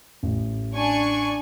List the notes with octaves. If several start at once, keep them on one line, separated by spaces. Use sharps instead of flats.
A1
D4 G#5 C#6